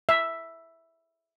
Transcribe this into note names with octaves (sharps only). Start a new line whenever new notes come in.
E5